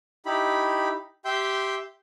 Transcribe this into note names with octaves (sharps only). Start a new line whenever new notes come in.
D#4 E4 G4 B5
G4 E5 G5 C6 G6